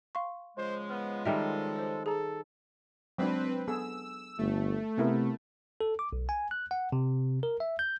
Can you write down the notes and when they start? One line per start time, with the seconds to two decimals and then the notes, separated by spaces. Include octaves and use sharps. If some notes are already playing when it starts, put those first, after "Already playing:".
0.15 F5 C6 C#6
0.57 C#3 F3 G#3 C5
0.89 B3 F6
1.25 D#3 G3 A4 A#4 E5
1.76 C5 E6
2.06 G#4 A4 A#5
3.18 F#3 G#3 C4 D4 B4
3.68 B3 G#4 A4 E6
4.38 G1 A3
4.98 C3 B3 E4 A#4
5.81 A4
5.99 D6
6.13 B1
6.29 G#5
6.51 F#6
6.71 F#5
6.92 C3
7.43 A#4
7.60 E5
7.79 G6